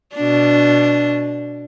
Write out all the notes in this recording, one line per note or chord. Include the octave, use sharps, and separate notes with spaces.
B2 D4